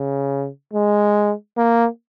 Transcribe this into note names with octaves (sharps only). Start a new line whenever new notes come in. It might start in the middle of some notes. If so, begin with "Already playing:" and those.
Already playing: C#3
G#3
A#3